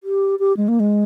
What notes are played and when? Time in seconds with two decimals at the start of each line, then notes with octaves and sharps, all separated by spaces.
0.04 G4
0.39 G4
0.57 G#3
0.68 A#3
0.80 G#3